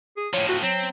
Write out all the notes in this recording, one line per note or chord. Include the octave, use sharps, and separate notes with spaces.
G#4
A2 F3 C#5
F#4
F#3 C4